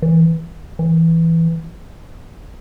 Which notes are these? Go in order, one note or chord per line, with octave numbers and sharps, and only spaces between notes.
E3
E3